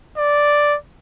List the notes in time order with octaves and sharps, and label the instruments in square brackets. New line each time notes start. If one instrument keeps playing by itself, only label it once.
[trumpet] D5